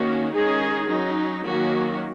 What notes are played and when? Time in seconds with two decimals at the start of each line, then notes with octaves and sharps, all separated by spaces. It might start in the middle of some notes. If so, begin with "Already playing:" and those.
Already playing: D#3 A#3 C#4 F#4
0.33 D#3 G#3 C#4 D#4 G#4
0.89 F#3 C#4 D#4
1.45 D#3 F#3 A#3 C#4 F#4